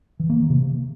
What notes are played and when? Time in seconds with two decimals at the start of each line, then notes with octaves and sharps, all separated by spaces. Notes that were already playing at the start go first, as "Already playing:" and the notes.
0.20 E3
0.30 A#3
0.40 D#3
0.50 C3